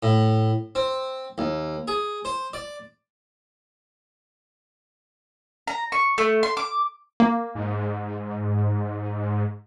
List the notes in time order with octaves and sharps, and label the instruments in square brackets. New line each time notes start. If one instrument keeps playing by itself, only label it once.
[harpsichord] A2
C4
D#2
G#4
C5
D5
[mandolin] A#5
C#6
A3
C6
D6
[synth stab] A#3
[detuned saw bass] G#2